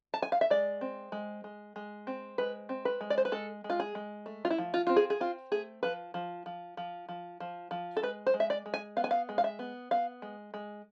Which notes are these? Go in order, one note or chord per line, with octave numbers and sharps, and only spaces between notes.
A5
G#5
F5
E5
G#3 D5
C4
G#3
G#3
G#3
C4
G#3 B4
C4
B4
G#3
D5
C5
B4
G#3 A4
G#3
F4
G#4
G#3
A3
F4
E4
F3
F4
C4 F4
G#4
G#4
C4 F4
A3 G#4
F3 B4
F3
F3
F3
F3
F3
F3
A4
G#3 B4
C5
G#3
E5
D5
G#3
G#5
B3 F5
G#5
F5
G#3
F5
E5
B3
B3 F5
G#3
G#3